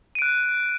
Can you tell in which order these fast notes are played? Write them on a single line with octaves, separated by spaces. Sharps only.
D#7 D7 F#6